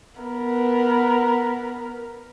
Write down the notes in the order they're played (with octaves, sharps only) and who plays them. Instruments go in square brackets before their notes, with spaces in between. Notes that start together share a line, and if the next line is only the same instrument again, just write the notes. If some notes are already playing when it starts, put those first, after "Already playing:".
[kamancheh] B3 A#4